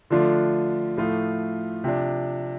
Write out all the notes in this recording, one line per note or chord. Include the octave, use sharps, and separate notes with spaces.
D3 F3 A3 D4 F4
A2 F3 A3 F4
C3 F3 D4